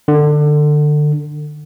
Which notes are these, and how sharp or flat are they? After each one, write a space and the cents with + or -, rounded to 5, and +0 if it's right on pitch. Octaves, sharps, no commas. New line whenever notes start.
D3 +25